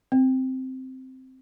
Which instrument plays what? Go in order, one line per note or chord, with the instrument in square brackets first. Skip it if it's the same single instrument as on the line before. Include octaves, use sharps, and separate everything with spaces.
[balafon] C4